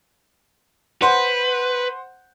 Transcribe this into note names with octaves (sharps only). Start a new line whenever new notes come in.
B4 C5 F#5